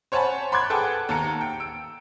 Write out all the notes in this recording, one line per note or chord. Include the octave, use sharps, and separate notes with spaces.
C5 C#5 F#5 G#5 A5 B5
B5 C6 D6 F#6 G#6
G#4 A4 B4 F#5 G5 A5
D#2 A5 A#5 C#7
G5
E6 D7